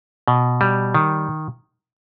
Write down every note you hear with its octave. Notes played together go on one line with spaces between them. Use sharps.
B2
G3
D#3